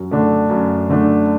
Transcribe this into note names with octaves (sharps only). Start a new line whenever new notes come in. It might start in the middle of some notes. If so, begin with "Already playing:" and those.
Already playing: F#2
D3 A3 D4
F#2
D3 A3 D4